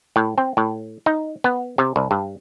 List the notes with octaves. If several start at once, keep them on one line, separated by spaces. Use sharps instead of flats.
A2
C4
A2
D#4
B3
C3
C2
G2